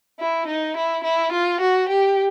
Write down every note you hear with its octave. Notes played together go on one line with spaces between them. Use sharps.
E4
D#4
E4
E4
F4
F#4
G4